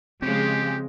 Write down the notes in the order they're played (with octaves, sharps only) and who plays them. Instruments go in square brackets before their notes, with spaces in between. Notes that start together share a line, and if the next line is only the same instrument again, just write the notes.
[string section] C#3 F3 G#3 [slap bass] C4 [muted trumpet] G4